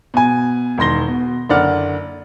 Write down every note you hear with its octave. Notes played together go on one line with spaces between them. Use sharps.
B2 G#5
E1 D#3 C6 A#6 G7
B2
F#1 D3 D5 F#5 F6